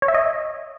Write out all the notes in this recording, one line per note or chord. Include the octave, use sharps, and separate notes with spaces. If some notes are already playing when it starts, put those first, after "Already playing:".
C#5
E5
D#5